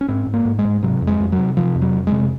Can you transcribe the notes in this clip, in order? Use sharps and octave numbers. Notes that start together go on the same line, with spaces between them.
C#4
G#2 C4
G#2
A#3
G#2
G#3
G#2
C3 F#3
F2
G#3
F2
F#3
C3
C3 F3
F2
F#3
F2
G#3
C3